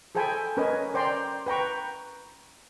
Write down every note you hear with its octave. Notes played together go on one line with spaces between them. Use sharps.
G#4 A4 C5 G5 G#5 B5
C#4 A#4 B4 C#5 D#5 G#5
C5 D5 G5 A#5 C6
B4 G5 A#5 C#6